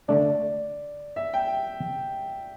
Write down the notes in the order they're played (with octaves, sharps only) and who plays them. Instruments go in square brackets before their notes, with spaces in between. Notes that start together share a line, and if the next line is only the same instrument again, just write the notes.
[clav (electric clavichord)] D3 A3 D4 [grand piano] D5
[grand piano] E5
G5